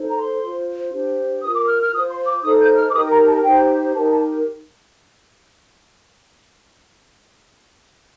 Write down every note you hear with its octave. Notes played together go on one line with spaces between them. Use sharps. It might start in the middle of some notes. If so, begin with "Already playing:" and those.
Already playing: D#4 A4 C5
A#5
C6
F4 C5
D4 G4 C5
F4 A#4 D#6
D6
D#6
F6
F6
F4 C5 D#6
C6
D6
D#4 A4 C5 D#6
G6
F6
D6
D#4 G4 A#4 D#6
A#5
A5
D#4 G4 C5 G5
D#4 G4 A#4 A5
A5